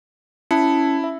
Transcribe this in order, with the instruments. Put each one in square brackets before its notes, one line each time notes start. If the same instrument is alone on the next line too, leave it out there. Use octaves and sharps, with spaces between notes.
[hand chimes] C#4 A5 C#7 [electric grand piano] E4
[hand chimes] E5